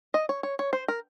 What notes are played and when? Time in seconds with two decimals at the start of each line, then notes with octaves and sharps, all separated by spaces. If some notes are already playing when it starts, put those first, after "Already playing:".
0.14 D#5
0.29 C#5
0.43 C#5
0.59 C#5
0.73 C5
0.88 A#4